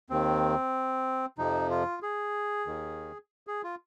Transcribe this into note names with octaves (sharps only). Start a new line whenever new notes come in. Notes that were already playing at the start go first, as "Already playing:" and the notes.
D#2 D#3 C4
F2 C3 F3 D#4
F4
G#4
D#2 D#3
G#4
F4